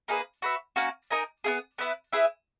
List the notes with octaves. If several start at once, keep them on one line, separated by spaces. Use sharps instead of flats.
A#3 D#4 G#4 B4
F#4 B4 E5
A#3 C#4 F#4
D#4 A#4 D#5 G#5
B3 E4 G#4
B3 E4 B4
E4 G#4 B4 E5